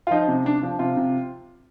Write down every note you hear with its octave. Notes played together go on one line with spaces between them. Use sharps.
F4
F3 D#4
C3
C3 D4
F3
C3 F4
C3